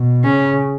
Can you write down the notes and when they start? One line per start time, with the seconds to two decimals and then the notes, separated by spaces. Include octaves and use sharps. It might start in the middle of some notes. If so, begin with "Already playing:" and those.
Already playing: B2
0.24 C#3 C#4